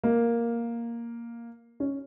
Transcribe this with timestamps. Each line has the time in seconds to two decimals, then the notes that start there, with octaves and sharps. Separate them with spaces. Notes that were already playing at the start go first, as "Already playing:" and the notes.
0.04 A#3
1.80 C#4